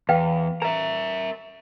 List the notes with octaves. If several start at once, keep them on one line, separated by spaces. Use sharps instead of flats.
E2 B4 F5 G5
A#4 E5 A#5